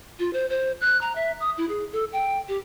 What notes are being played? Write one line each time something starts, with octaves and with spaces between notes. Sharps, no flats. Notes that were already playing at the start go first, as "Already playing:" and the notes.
F4
C5
C5
F#6
A#5
E5
D#6
E4
G#4
A4
G5
G4